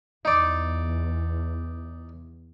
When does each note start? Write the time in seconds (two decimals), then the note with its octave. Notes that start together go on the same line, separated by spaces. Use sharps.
0.25 E2 D#4 D5